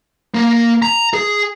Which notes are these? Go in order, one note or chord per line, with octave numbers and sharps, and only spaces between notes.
A#3
A#5
G#4